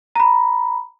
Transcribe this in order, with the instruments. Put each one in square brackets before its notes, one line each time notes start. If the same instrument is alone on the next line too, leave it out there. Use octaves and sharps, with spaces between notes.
[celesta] A#5 B5